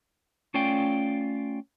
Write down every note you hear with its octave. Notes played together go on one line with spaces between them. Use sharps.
A3 C#4 F4 D5 G5